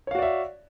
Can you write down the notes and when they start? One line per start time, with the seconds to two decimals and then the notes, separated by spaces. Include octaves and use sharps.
0.07 C#5
0.11 F5
0.15 F#4
0.19 D5
0.22 E5